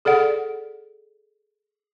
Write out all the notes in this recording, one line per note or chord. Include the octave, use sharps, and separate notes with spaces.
G#4 A4 D5 F#5